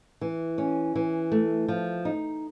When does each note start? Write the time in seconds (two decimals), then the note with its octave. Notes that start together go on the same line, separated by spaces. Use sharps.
0.21 E3
0.58 C#4
0.96 E3
1.32 A3
1.68 F3
2.05 D#4